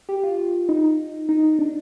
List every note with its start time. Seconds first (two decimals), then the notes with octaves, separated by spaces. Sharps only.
0.09 G4
0.23 F4
0.39 F4
0.69 D#4
1.29 D#4
1.59 D4